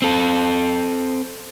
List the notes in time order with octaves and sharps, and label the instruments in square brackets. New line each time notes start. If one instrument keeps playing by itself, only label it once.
[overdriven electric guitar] C4 A4